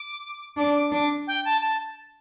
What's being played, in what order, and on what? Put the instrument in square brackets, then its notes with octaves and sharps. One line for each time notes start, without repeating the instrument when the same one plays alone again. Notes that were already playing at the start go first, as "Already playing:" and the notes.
Already playing: [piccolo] D6
[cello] D4 [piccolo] D6
[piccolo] D6
[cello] D4 [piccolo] D6
[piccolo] G5
A5
A5